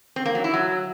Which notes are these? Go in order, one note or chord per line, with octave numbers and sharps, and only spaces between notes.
C4
A#3
F#3
E4
F#3